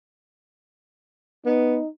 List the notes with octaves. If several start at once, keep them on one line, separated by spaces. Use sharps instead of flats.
B3 D#4